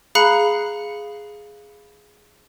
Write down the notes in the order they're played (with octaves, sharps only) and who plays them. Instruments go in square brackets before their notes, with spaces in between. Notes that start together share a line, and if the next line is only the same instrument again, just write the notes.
[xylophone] G#4 F5 A#5 B5 F#6 C#7